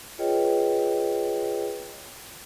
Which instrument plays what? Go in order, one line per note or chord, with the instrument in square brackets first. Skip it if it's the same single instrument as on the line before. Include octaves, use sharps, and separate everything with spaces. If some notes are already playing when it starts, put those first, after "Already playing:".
[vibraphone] F4 G#4 B4 C#5 D#5 G5